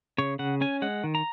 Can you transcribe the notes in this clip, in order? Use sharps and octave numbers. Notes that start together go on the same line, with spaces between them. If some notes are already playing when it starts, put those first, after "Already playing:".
C#3 C#5
C#3 F#5
C#4 G#5
G#3 F#5
D#3
A#5